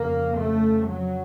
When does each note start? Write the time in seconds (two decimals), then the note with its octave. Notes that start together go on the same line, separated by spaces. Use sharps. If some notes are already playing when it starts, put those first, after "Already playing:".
Already playing: F2 C#3 A#3
0.39 A3
0.89 F#3